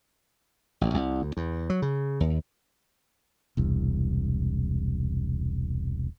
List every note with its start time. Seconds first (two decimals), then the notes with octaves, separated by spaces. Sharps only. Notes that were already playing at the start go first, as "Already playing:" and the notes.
0.81 A1
0.94 C2
1.22 D2
1.37 E2
1.70 F#3
1.82 C#3
2.20 D#2
3.57 E1 C2